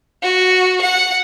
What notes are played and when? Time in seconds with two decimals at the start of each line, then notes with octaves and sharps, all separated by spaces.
0.22 F#4
0.81 F#5